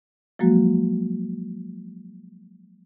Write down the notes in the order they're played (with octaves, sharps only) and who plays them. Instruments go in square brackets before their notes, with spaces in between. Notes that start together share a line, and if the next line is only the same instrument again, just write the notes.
[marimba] F3 F#3 G#3 A#3 F#4